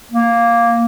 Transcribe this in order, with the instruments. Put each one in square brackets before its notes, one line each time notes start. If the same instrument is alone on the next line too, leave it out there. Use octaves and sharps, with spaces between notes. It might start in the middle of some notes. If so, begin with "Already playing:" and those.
[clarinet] A#3